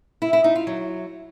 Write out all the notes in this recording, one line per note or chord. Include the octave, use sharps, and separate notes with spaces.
E4
E4
D#4
F4
F#3